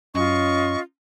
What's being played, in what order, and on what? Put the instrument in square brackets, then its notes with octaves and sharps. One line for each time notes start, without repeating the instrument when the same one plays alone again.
[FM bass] F#2 [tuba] C#4 [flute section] F4 D#5 [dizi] C#6